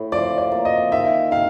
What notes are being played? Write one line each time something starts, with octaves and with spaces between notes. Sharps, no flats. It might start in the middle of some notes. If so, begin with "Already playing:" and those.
Already playing: A2
F3 D5
D5
A#3
D#5
D#3 E5
D#3 F5